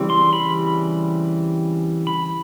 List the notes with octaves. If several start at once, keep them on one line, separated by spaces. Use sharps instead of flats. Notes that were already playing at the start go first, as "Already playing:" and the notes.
Already playing: C#3 E3 G3 C4
C6
B5
B5